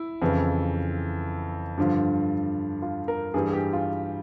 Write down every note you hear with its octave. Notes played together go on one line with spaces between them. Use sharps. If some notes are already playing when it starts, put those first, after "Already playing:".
Already playing: E4
F2 C#3 E3
G2 D3 F3
F4
A#4
G2 E3 G3 G#4
G#4
G4
F4